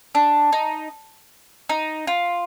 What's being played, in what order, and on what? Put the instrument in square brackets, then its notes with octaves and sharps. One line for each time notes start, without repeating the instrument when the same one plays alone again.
[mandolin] D4
D#4
D#4
F4